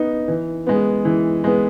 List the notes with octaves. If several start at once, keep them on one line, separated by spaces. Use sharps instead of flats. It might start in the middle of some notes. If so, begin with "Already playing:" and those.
Already playing: B3 D#4
E3
G#3 B3
E3
G#3 B3